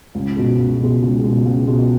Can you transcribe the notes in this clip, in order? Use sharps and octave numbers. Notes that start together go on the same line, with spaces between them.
C#2
B2 G#3
C#2
B2 G#3
C#2
B2 G#3
C#2
B2 G#3